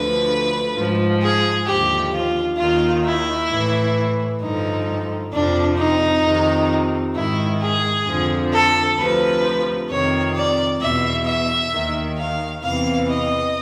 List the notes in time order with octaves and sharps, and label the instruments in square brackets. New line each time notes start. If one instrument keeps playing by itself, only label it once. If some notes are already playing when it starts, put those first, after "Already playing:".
Already playing: [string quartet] D2 D3 F3 B4
G#2 F3
G#4
D#2 D3 F3 G4
F4
D#2 D#3 F4
E4
A2 E3
G2 D3 F3 D#4
F2 C3 F3 D4
D#4
F2 C3 D#3
G#2 D#3 E4
G#4
F2 D3 F3
A4
D2 C3 F3 B4
F2 C3 D#3 C#5
D5
E2 B2 E5
E5
D#2 D#3
F5
E2 C3 E3 F5
D#5